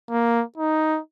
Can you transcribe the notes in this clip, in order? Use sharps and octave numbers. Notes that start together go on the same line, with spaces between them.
A#3
D#4